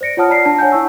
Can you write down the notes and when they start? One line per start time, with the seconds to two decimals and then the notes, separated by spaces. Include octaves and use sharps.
0.01 C5 D5 A#6 C#7 D7
0.17 F4 C#5 F#5 A5 D#6 F6
0.30 D5 A#5 B6 C7
0.45 D4 A5
0.58 C#5 F#5 G#5 G6
0.72 E4 A5 C#6 E6